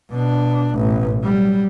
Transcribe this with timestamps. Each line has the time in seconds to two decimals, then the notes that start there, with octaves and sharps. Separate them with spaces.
0.10 B2 D4
0.76 A1 B2
1.23 F#3 G3